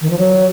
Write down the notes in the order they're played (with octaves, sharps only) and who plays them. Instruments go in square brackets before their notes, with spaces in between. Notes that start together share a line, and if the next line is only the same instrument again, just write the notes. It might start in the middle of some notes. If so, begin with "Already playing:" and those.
[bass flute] D#3
F3
F#3